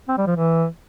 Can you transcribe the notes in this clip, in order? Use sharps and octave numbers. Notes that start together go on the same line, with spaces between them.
C4
G3
F3
E3